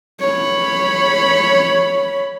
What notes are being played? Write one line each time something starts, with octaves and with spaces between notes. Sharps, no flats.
C#5 B5